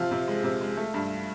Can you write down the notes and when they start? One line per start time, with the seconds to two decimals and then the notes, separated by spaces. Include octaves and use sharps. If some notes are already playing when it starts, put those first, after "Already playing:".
Already playing: C3 F3 F4
0.11 C3
0.28 G#3
0.44 C3
0.61 G#3
0.77 A3
0.94 G2